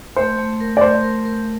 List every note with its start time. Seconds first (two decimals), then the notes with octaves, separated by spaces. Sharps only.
0.16 A3 C5
0.39 A3
0.60 A#4
0.77 D5
0.81 A3 C5
1.03 A#4
1.25 A#4